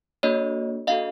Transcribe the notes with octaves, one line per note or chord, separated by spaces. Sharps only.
A#3 D4 F#4 A4 C#5 D#5
A#3 D4 F#4 A4 D#5 F5